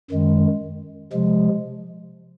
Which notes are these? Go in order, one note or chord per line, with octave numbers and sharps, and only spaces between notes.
F#2 D#3 G#3
C3 F3 G#3